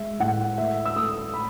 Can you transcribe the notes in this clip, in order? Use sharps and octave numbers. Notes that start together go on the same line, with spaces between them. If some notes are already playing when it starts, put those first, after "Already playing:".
Already playing: G#3 E5
A2 F#5
A3 E5
E6
A3 D#6
B5